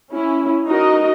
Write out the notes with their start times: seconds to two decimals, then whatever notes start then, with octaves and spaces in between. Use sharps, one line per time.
0.12 C#4 E4
0.66 D#4 F#4 A#4 D#5